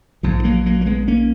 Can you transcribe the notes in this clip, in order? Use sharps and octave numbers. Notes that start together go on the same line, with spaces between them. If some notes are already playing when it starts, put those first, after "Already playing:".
A#1 G#2 F3
F#3 A#3
F#3 A#3
A#3
G#3 B3
A#3 C#4